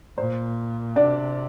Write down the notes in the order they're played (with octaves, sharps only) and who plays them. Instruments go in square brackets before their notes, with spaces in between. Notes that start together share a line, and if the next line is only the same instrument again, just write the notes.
[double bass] A#2 [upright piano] C5
[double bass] C3 [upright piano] D4 D5